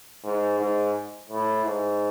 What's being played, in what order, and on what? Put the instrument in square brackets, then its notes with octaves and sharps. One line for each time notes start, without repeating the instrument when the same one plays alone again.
[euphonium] G#2
G#2
A2
G#2